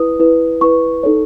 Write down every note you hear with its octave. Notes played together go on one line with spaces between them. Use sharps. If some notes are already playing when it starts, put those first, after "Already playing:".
Already playing: E4 B4 D#6
E4 B4
E4 B4 C#6
D#4 A4 C#5